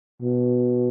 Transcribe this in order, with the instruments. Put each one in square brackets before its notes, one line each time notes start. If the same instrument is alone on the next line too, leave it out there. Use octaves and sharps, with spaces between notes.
[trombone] B2